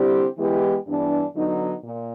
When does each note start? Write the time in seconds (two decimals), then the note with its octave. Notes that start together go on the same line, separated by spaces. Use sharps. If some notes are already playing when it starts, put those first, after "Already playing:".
Already playing: D3 G3 C4 E4 G4
0.37 E3 G#3 B3 E4 G4
0.86 G2 E3 G3 B3 D4
1.35 D3 F#3 B3 D#4
1.84 A#2